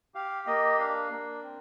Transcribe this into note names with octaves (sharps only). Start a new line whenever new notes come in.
G4 F5
A#3 D#5
D4 F5
A#3
C4